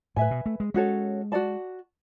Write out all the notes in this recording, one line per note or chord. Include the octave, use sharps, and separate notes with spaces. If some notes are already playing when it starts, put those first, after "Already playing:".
A2 B4 E5 G#5
B2
A3
G#3
G#3 C#4 F#4 A4 C#5
F#4 A4 D5 A5